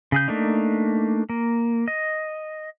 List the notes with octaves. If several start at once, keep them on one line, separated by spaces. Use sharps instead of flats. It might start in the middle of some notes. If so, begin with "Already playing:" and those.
C#3 G#4 G6
A3 A#3 D4 D#4
A#3
D#5